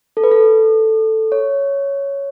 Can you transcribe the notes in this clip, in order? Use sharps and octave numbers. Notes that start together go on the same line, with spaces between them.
A4
B4
A4
C#5